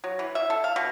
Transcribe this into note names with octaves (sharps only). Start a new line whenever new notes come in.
F#3
E3
E5
A4
F5
B2